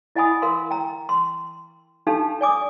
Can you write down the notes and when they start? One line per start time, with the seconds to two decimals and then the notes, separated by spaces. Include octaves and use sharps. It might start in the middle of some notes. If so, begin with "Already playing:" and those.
0.16 E4 D#5 F#5 G#5 B5 D#6
0.42 A#4 F5 C6
0.71 G5 A#5
1.09 C6
2.07 D4 D#4 G4 A4 F5 A5
2.41 D5 G#5 D6 D#6